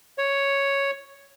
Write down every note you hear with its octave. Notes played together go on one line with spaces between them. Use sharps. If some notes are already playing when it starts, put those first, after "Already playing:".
C#5